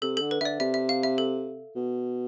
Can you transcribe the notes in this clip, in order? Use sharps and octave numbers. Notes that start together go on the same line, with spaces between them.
C3 A4
D3 A4
B4
D3 D5 E5
C3 E5
E5
F5
E5
A4
B2